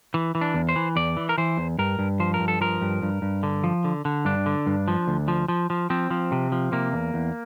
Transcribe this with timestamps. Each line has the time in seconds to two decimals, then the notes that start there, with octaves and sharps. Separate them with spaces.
0.14 E3
0.35 E3
0.41 D4
0.54 E2
0.69 C5
0.76 E3
0.96 E2 D5
1.17 E3
1.29 A#4
1.38 E3 C5
1.58 E2
1.79 G2 A#4
1.99 G2
2.20 F3 C5
2.34 A#4
2.40 G2
2.48 A4
2.61 F3 A#4
2.82 G2
3.02 G2
3.22 G2
3.43 D3
3.64 F3
3.84 D3
4.05 D3
4.25 G2 D4
4.46 D3
4.67 G2
4.88 F3
5.08 D2
5.28 F3
5.48 F3
5.70 F3
5.90 F3 C4
6.11 F3
6.32 C3
6.52 F3
6.72 C3 A#3
6.93 E2
7.14 E2